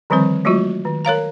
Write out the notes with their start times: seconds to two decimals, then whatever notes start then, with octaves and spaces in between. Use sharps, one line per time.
0.10 D3 D#3 F3 G3 C4 C5
0.45 F#3 G#3 A3 F4 F#4
0.85 D#3
1.05 A#4 C#5 F5 A#5